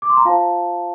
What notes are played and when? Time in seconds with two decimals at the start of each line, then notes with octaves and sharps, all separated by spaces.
0.02 D6
0.10 C6
0.17 A#5
0.25 F4 C5 F5 A5